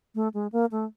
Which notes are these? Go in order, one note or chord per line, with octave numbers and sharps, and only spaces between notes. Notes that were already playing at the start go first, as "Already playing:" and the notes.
A3
G#3
A#3
A3